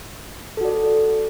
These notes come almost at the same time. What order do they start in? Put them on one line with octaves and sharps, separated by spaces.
A4 F#4 D5